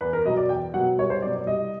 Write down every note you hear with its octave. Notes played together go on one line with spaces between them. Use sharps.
E2 B4
A#4
B2 F#3 D#5
D5
E2 G5
B2 F#3 F#5
C2 C#5
C5
B2 F#3 D5
D5
C2 D#5